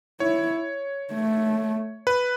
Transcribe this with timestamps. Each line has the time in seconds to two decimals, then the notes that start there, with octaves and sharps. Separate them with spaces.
0.20 E4 C#5
1.13 A3
2.07 B4